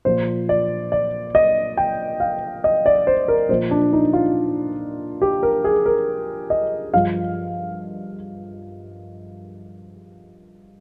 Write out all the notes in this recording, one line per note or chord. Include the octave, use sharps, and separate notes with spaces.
A#2 F3 C5
D5
D5
D#5
G5
F5
D#5
D5
C5
A#4
A#2 F3 C5
D4
D#4
F4
G4
A#4
G#4
A#4
D#5
G2 F3 F5